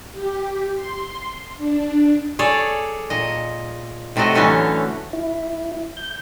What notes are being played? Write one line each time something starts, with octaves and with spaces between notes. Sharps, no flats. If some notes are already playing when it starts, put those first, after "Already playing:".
G4
C6
D4
G#4 A4 C#5 D5
A#2 D#5
A2 C3 A3 F#4 D#5
D3 E3 F#3 A3 C#4
E4
G6